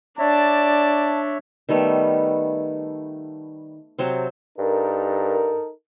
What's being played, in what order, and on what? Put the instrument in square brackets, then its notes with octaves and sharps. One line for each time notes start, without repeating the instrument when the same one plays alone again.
[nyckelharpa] D4 [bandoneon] C#5 E5 [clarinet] D5 [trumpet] A5
[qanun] D#3 G3 A3 B3
C3 F#3 C4
[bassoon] G2 [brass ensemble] D#4 A4 A#4